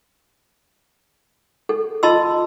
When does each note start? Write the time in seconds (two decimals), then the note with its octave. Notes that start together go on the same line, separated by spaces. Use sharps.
1.69 A4
2.03 F4 D#5 A5 B5 C6 E6